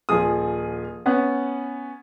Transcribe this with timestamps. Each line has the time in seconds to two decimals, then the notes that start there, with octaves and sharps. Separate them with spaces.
0.09 D#1 F3 G#4 D#6
1.06 B3 C#4 F#5